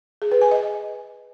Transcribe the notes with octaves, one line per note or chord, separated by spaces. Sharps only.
G#4
B4
G#5
D#5